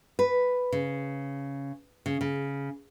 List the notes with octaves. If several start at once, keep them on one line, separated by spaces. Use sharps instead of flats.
B4
C#3
C#3
C#3